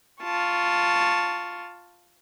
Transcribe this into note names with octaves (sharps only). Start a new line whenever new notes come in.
F4 A5 C#6